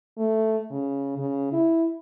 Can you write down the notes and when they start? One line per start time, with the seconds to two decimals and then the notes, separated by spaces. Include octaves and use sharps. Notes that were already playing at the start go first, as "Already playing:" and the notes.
0.18 A3
0.71 C#3
1.18 C#3
1.53 E4